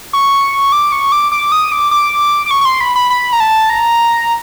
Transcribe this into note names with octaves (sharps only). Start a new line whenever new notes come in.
C#6
D6
C#6
D6
D6
D#6
D6
D6
D6
C#6
C#6
C6
B5
B5
B5
A#5
A5
A#5